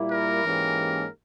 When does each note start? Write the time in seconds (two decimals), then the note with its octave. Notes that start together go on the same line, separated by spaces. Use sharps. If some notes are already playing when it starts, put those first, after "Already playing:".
Already playing: A#2 G3 A#3 E4
0.11 A#4
0.43 G#2 E3 A#3 C#4 G4